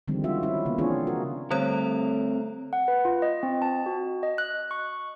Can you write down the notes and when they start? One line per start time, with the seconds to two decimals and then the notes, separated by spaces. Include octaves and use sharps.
0.08 D3 D#3 F3 G3 G#3 C4
0.24 F4 F#4 E5
0.43 C4 C#4 E4
0.65 C#3 A#3 B3
0.78 E3 C4 D4 F4 G#4 C#5
1.07 F#4 A#4
1.51 D3 G3 A3 C4 A#4 C#5
2.73 F#5
2.88 B4
3.05 F4
3.22 D#5
3.43 C4
3.62 A5
3.86 F#4
4.23 D#5
4.38 F#6
4.71 C#6